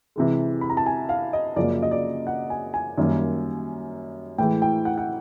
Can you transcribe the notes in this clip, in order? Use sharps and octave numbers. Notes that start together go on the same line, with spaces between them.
C3 E3 G#3
B5
A#5
A5
G#5
F5
D#5
F#2 C#3 F3 A#3 D5
D#5
D5
F#5
G#5
G#5
F#2 D#3 G3 A#3
A2 E3 G#3 G5
G5
F#5
F#5